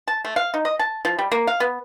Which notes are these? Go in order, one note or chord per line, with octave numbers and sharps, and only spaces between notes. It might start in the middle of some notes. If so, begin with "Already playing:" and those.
A5
A3
F5
D#4
D#5
A5
F3
G3
A#3
F5
B3